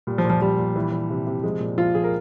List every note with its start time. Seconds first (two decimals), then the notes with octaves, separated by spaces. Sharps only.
0.07 A#2 G3
0.18 F3
0.24 A#2
0.30 F3
0.41 F3 G3
0.58 A#2
0.76 E3
0.92 E3
1.10 C3
1.27 C3
1.43 F3 G#3
1.60 A#2
1.78 F3 F4
1.95 F3 G#4
2.04 A#4